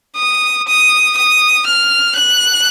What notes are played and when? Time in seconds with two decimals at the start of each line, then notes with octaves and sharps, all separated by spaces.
0.17 D#6
0.67 D#6
1.17 D#6
1.67 F6
2.16 F#6